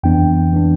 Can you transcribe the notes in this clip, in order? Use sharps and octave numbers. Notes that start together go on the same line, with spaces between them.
F2 E3 B3 D4 G5
E3 B3 D4